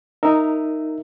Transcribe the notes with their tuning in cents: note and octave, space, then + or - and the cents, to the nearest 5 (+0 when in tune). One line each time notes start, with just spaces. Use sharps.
D#4 +0 A#4 -15 E5 +0